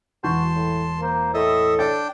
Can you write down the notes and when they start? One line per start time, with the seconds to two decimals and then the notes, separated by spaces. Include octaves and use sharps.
0.24 E1 E3 F#4 A5 C6 G6
0.55 A2
1.00 A#3 C5
1.34 A2 A4 D#5 E5 D#6
1.79 D4 C#5 D5 G5 A6